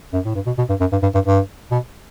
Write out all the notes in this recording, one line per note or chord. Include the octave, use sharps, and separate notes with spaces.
F#2
A2
G2
B2
B2
G2
F#2
G2
G2
G2
G2
B2